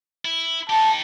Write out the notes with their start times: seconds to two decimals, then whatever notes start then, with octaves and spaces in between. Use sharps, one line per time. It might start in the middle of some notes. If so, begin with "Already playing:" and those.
0.25 E4
0.69 D#4 G4 A5